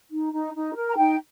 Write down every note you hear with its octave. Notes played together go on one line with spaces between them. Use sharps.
D#4
D#4
D#4
A#4
A#5
D#4 G5